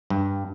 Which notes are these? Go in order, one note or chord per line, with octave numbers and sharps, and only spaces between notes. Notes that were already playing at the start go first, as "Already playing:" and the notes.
G2